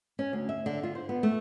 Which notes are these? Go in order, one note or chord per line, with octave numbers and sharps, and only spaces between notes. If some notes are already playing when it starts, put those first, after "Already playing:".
C#4
D2
E5
D3
F4
C5
B3
A3